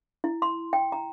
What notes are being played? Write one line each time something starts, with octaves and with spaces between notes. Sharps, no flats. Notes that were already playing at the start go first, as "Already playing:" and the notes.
E4
C6
G5
A#5